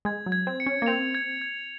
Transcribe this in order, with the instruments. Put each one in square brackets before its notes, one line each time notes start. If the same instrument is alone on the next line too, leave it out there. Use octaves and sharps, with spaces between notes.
[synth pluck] G#3 [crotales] G#6
[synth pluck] F#3
[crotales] G#6
[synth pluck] C4
[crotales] C#7
[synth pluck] C#4
A#3
[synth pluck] C4 [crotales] F7
[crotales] G#6
G#6